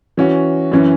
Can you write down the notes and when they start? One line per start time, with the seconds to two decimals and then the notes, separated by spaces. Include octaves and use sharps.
0.17 E3 C#4 F#4
0.72 F#2 E3 C#4